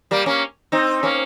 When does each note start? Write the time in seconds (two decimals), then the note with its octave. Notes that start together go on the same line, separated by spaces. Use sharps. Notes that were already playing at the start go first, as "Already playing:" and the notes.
0.11 G3 A#3
0.26 A#3 C#4
0.72 C4 D#4
1.03 A#3 C#4